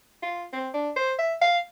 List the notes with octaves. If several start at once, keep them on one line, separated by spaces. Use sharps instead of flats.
F4
C4
D4
C5
E5
F5